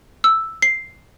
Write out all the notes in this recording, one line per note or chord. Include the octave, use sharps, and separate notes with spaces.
E6
C7